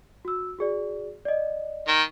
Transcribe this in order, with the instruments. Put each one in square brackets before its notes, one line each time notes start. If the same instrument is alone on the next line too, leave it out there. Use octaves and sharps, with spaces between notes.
[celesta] F#4 E6
F#4 G#4 D5
D5 D#5
[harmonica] D#3